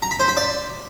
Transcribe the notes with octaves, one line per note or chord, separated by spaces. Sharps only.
A#5
B5
C5
B5
D5